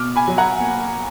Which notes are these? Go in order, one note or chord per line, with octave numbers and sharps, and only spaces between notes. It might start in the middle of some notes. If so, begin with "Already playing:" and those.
Already playing: B2 D6 F6
G#5 B5
F#3
F#5 A#5
A#3